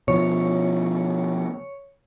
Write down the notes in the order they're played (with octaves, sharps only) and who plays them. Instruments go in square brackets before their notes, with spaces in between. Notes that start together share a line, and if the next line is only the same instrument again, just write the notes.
[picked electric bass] B2 F3 [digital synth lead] C#5